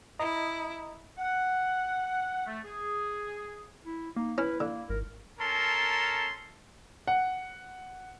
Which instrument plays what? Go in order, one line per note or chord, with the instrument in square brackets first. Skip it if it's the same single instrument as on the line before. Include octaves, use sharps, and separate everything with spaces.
[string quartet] E4 [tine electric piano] D#5 A#5 D#6
[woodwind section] F#5
A3
G#4
[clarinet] E4
[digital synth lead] A#3 [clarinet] D#4
[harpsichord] C#4 [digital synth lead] E4 [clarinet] B4
[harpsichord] D3 [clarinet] A#3
[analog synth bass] G#1 [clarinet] A#4
[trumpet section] C#4 A4 A#4 A5 A#5 C6
[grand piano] F#5